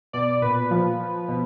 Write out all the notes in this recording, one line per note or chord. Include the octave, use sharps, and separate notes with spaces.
B2 D5
A#2 B4
F3
F3
B2